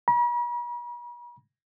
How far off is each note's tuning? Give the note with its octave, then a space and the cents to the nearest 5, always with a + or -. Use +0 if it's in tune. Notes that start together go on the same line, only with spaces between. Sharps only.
B5 -45